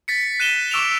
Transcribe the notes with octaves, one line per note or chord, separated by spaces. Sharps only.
A6 B6 C#7
F#6 D#7 E7 G7
C#6 D6 E6 D7 E7 F7